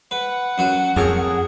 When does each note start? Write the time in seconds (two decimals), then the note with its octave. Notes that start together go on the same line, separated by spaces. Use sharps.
0.11 B4 F#5
0.58 F#2 F#4
0.96 F2 G#4 A#4 C#5